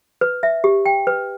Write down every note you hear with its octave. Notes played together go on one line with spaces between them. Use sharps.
B4
E5
G4
G5
B4